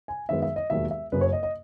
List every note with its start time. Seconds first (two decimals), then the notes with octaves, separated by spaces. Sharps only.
0.08 G#5
0.29 F#2 D#3 G#3 B3 E5
0.42 E5
0.56 D#5
0.70 E1 D#2 D#3 F#3 E5
0.91 E5
1.12 F#1 F#2 C#3 B4
1.21 C#5
1.33 D#5
1.43 D#5